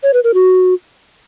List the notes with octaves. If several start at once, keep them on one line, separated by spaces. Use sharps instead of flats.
C#5
B4
A#4
F#4